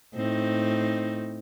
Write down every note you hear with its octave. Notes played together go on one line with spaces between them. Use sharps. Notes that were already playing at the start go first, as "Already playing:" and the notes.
A2 C4 D#4